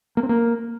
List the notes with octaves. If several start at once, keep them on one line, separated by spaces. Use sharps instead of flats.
A#3
C4
A#3